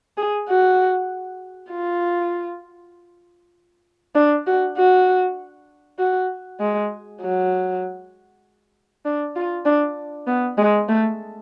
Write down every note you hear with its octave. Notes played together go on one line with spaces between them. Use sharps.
G#4
F#4
F4
D4
F#4
F#4
F#4
G#3
F#3
D4
F4
D4
B3
G#3
A3